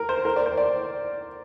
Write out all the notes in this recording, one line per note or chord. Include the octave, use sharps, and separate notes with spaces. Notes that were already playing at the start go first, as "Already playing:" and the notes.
Already playing: A#4
C5
A#4
D5
C5
D5